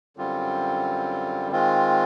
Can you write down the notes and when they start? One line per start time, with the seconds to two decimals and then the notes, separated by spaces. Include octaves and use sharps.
0.17 F#2 D3 G3 C4 F4
1.52 D#3 G#3 C4 F4